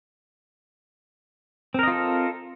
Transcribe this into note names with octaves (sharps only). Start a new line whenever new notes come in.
C4 F4 A4 A#4 D#5